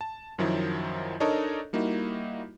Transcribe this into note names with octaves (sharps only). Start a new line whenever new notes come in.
A5
F#2 D#3 F3 F#3 E4
D4 D#4 A4 A#4 C#5 D#5
G3 A#3 D#4 E4 F#4